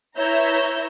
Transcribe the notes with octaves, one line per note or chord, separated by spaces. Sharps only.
E4 B4 C#5 E5 A#5 G6